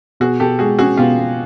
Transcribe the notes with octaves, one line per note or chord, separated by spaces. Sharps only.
B2 F#4 G#4
B2 G4 A4
G#3 F#4 G#4
C#4 F#4 G#4
B2 F4 G4
B2